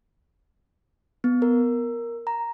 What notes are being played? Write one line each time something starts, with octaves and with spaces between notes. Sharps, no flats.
B3
A#4
A#5